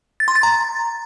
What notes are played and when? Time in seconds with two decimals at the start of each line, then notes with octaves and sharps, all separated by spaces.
0.20 A6
0.28 C6
0.35 A6
0.43 A#5